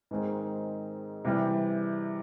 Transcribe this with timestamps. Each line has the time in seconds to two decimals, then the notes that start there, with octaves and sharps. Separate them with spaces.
0.11 G#2 D#3 G#3 C4
1.25 C3 E3 G3